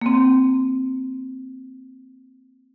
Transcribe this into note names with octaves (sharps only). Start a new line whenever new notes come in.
A#3 C4